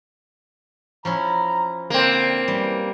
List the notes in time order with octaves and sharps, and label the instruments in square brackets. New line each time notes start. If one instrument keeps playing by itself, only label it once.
[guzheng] F3 C#4 E4 [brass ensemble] A#5
[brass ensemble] D3 [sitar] A#3 C4
[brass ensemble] E3 F#3 C#4 [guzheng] G3